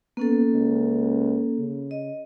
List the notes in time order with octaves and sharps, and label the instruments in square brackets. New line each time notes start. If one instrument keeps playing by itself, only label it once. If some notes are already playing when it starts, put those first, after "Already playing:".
[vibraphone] A#3 C#4 A4 [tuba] B3
[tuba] C#2
C#3
[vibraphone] D#5